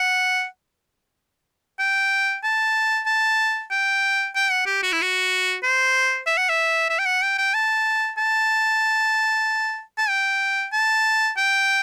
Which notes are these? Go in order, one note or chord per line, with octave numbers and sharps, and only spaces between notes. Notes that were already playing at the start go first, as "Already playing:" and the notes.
Already playing: F#5
G5
A5
A5
G5
G5
F#5
G4
F#4
E4
F#4
C5
E5
F#5
E5
E5
G5
F#5
G5
G5
A5
A5
A5
G5
A5
G5